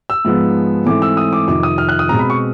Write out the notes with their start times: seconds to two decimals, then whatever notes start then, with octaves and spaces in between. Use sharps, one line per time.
0.10 E6
0.25 G#2 F3 G#3 B3
0.86 G#2 E3 A3 C4 D6
1.02 E6
1.17 D#6
1.33 D6
1.48 F2 C3 D#3 D6
1.63 D#6
1.78 F6
1.89 F#6
1.99 D#6
2.09 B2 G#3 C4 A#5
2.19 B5
2.30 C#6